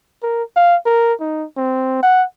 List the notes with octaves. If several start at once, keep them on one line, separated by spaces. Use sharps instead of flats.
A#4
F5
A#4
D#4
C4
F#5